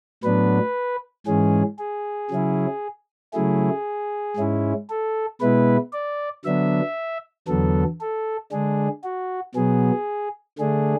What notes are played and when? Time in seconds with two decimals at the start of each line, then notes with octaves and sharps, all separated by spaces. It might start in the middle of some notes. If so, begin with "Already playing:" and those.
0.23 A2 F#3 B3 D4 B4
1.27 G#2 E3 G#3 C#4 G#4
1.79 G#4
2.31 C#3 F#3 C#4 E4
3.33 C#3 F#3 A3 E4 G#4
4.37 G#2 G#3 C#4 E4
4.90 A4
5.40 B2 G#3 B3 E4 B4
5.93 D5
6.45 D3 F#3 B3 D4 E5
7.48 E2 D3 F#3 B3 A4
8.01 A4
8.52 D3 G#3 D4 G#4
9.04 F#4
9.55 B2 F#3 B3 G#4
10.58 D3 A3 D4 G#4